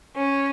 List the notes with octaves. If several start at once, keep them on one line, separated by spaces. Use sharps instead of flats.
C#4